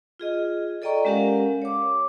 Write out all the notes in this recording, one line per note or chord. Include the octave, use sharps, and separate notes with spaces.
F4 G#4 D#5
A4 D5 D#5 G5 A#5 C#6
G#3 C#4 G4 A#4 F5 F#5
C#5 D6